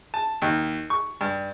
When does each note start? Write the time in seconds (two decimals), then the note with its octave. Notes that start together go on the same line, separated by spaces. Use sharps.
0.14 A5
0.42 D#2
0.90 C#6
1.21 G2